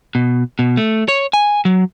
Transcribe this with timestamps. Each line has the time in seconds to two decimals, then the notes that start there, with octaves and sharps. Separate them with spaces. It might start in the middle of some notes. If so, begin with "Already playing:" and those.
0.15 B2
0.59 B2
0.77 A3
1.08 C#5
1.33 G#5
1.65 F#3